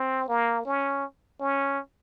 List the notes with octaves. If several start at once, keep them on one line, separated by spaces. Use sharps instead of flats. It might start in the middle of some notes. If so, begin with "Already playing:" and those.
Already playing: C4
A#3
C#4
C#4